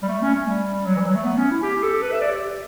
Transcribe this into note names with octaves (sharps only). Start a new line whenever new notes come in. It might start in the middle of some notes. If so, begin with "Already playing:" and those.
G3
A3
C#4
A3
G3
F#3
E3
G3
F#3
A3
B3
C#4
E4
G4
A4
B4
E5
D5
G4